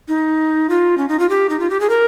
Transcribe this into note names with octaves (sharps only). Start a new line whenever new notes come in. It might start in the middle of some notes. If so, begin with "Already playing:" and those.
D#4
F4
C#4
D#4
F4
G4
D#4
F4
G4
G#4
A#4